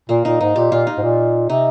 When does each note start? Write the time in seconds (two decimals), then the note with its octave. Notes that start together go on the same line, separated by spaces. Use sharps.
0.09 A#2 A#3
0.25 A#2 D#4
0.41 G#2 D#4
0.56 A#2 G4
0.72 A#2 F4
0.87 D#4
0.98 G#2
1.03 A#2
1.49 C3 D#4